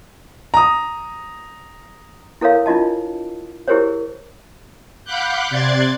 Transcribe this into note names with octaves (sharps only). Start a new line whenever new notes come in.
A#5 D#6
E4 A4 A#4 C#5 F5
D4 E4 F4 D#5 A5
E4 G4 G#4 A#4 C5 C#5
F5 F#5 B5 D6 F#6 G6
C3 D5 C6 F#6 G#6 A6